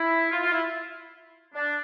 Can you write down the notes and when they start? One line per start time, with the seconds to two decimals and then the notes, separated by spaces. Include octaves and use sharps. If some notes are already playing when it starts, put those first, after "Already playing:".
Already playing: E4
0.32 F4
0.42 F4
0.52 E4
1.55 D4